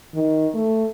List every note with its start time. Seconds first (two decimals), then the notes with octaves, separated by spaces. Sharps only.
0.15 D#3
0.54 A3